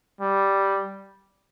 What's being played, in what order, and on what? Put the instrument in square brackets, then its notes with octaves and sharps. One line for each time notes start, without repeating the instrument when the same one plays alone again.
[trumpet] G3